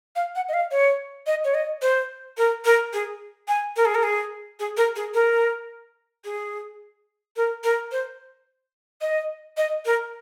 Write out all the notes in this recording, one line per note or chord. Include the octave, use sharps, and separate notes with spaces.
F5
F#5
D#5
F5
C#5
D#5
C#5
D#5
C5
A#4
A#4
G#4
G#5
A#4
G#4
A#4
G#4
G#4
A#4
G#4
A#4
G#4
A#4
A#4
C5
D#5
D#5
A#4